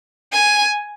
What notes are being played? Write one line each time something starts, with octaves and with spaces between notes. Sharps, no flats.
G#5